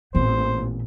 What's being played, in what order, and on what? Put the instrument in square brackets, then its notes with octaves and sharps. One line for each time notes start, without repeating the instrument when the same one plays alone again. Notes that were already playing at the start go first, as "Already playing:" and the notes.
[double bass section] A1 A#2 [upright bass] B3 C4 [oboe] C5